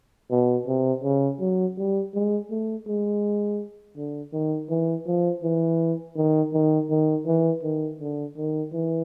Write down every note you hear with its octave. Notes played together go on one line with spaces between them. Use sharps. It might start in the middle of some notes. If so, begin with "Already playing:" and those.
B2
C3
C#3
F#3
G3
G#3
A3
G#3
D3
D#3
E3
F3
E3
D#3
D#3
D#3
E3
D#3
D3
D#3
E3